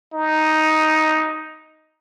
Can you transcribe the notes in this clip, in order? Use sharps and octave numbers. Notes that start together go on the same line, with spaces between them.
D#4